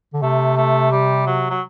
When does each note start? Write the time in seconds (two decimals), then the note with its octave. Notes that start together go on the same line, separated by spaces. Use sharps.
0.14 D3
0.22 C3 A3
0.57 A3
0.92 G3
1.27 F#3
1.50 F#3